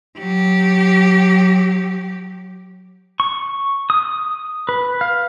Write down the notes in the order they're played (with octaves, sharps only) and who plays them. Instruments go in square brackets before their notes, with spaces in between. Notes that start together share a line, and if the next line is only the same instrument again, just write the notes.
[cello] F#3 G4
[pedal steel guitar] C#6
D#6
B4
F5